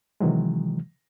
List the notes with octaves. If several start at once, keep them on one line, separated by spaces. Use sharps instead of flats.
C3 D#3 E3 F#3 G#3